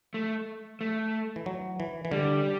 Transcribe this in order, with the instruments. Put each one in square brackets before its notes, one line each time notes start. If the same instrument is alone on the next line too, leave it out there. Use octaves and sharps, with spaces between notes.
[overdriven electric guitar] A3
A3
[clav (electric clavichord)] E3
F#3
E3
E3
[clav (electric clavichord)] D3 [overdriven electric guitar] G3